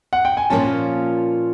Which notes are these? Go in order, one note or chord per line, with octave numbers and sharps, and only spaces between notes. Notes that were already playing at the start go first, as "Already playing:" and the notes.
F#5
G5
G#5
A#2 F3 A#3 C#4 F4 A5